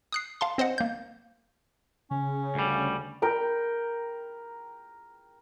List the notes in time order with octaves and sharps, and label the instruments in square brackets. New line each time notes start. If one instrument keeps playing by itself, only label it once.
[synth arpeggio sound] D#6 F#6 C7
F5 A5 C6
C4 C5 D#5 F#5
A#3 G6
[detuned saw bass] C#3 [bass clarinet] C#4
[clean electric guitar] D2 G3
[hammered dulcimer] A#4 G5 B5